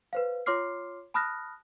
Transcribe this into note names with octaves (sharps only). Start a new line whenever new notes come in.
B4 C5 F5
F4 C#5 C6 D6 F6 C7
A5 B5 D#6 F6 F#6 A#6